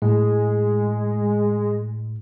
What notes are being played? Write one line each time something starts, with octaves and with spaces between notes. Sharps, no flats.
A2 G#3